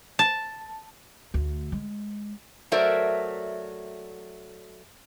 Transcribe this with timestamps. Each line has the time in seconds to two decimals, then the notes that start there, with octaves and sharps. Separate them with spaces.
0.19 A5
1.34 D2
1.72 G#3
2.72 F#3 A3 A#4 C5 D5 E5